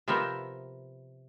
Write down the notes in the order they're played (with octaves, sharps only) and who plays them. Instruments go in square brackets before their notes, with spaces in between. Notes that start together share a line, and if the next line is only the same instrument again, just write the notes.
[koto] C3 F3 B3 A#4 E5 G5